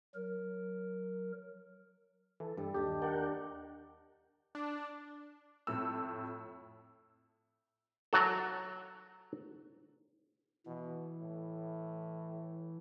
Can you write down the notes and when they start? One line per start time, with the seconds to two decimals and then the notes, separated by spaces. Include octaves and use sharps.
0.15 F#3 A#4
2.40 E3 A4
2.57 G2 G3
2.74 D#2 D4 G4 D#5
3.02 A#4 D5 F#5 G5
4.55 D4
5.67 F2 A2 E6
8.13 F#3 F#4 A4
10.66 B2 E3
11.21 A2